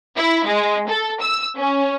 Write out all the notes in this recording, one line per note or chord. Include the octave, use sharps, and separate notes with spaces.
E4
G#3
A4
E6
C#4